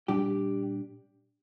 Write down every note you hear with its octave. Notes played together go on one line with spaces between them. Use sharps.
A#2 G3 D4 G4